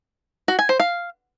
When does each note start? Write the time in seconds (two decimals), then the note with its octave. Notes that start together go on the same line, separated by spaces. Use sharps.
0.48 F#4
0.59 G#5
0.69 C5
0.80 F5